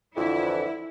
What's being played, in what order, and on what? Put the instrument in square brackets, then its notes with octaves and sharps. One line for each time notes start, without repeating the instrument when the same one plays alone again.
[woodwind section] F2 D3 E3 [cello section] E4